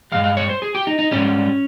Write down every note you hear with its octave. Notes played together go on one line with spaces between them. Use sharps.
G2 F3 G#3 F5
F5
C#5
C5
G#4
G4
D#4
D#4
G#2 G3 C#4